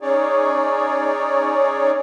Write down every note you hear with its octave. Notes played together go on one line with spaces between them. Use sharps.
C#4 D#4 G#4 C#5 D5